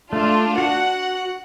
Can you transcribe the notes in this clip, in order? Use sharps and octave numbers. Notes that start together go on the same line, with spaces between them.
A3 D4 F4
F#4 F#5